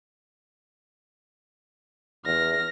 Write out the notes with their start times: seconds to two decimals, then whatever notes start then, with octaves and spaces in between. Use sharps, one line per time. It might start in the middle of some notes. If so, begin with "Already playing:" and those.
2.26 E2 F6 A#6